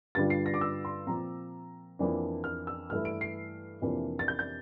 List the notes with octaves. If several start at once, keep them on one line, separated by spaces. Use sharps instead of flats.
G2 D3 G3 D4 F4 A6
C7
A#6
D6
E6
C6
A#2 F3 C4 A#5
F2 E3 A#3 D4
F6
E6
G2 E3 A3 E4 F6
D7
C7
F2 C3 E3 A#3 D4
A6
G6
G6